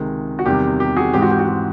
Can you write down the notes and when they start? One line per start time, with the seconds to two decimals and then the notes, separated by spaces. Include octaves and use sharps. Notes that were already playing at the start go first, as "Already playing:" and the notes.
Already playing: C#2 C3 D#3 G#3
0.39 F#4
0.46 E2 C3 D#3 G3 G4
0.80 G4
0.96 F#4 G#4
1.14 G#2 E3 G#3 C4 G4
1.22 F#4
1.31 G4
1.39 F#4
1.48 G4